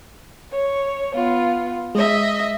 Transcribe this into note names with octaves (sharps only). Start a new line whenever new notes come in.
C#5
B3 F4
G#3 D#5 E5